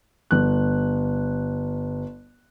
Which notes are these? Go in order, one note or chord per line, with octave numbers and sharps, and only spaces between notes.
G1 F#6